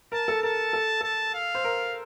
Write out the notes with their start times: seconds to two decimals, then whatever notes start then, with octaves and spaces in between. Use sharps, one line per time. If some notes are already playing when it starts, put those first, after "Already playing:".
0.12 A#4 A5
0.28 A4
0.43 A#4 A5
0.73 A4
1.01 A4 A5
1.34 F5
1.55 C5
1.64 A#4